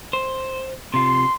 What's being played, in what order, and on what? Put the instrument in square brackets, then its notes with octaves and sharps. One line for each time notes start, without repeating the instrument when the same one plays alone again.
[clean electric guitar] C5
[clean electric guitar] C3 F4 [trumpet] C6